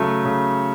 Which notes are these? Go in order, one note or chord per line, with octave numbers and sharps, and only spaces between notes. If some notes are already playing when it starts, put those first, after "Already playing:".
Already playing: C#3 F#3 A3
C#3